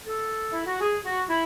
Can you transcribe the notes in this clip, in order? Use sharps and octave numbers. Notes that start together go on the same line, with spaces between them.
A4
E4
F#4
G#4
F#4
E4